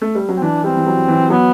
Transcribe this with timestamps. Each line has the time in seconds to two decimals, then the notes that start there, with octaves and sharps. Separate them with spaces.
0.01 A3
0.15 G3
0.29 F#3
0.37 C4
0.42 E3 D4
0.64 G3 C4
0.77 E3
0.87 F#3
1.08 E3
1.30 F#3 B3